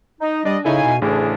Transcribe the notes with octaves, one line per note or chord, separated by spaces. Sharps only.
D#4
G3 D4 D5 D#5
C#3 D#4 E4 A4 C#5 F5 G#5
B2
A1 D2 A2 C#3 D4 G#4